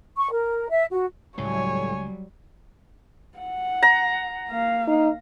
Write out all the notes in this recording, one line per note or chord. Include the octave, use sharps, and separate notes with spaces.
C#6
A#4
E5
F#4
C#2 A2 F#3 G3 C#5 G#5
F#5
A#5
A#3 F5
D#4